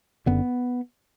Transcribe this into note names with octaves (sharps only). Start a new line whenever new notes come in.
F#1 F#2 D3 B3